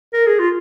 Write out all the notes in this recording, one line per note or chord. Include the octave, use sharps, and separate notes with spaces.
A#4
G#4
F4